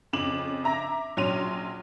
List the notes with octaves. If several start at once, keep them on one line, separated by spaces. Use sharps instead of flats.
F2 C#3 D6 E7 F#7
E5 A#5 D6 A#6
A#1 F#3 C#4 C6 D#7 F7